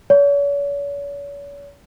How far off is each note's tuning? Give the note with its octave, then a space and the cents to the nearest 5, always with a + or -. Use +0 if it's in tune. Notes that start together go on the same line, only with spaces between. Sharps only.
C#5 +45